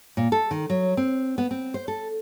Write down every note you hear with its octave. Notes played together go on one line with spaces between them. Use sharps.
A#2
A4
D#3
F#3
C4
B3
C4
C5
A4